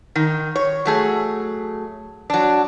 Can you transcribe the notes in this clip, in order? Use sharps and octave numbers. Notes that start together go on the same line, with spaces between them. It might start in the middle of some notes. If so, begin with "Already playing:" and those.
D#3
C#5
F#3 A3 G#4
F#3 D4